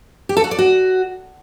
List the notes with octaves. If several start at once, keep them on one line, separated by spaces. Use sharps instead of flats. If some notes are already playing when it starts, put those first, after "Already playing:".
G4
A4
F#4
D5
F#4